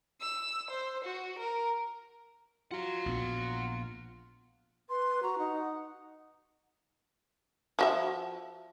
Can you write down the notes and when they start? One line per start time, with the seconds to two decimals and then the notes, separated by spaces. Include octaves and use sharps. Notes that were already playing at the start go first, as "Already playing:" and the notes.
0.21 E6
0.70 C5
1.04 F#4
1.38 A#4
2.71 F3 F#3 F4 F#5 A#5
3.06 A#1 A#2 B3
4.89 B4 C6
5.23 F#4 A#5
5.38 D#4 F#5
7.79 F3 F#4 E5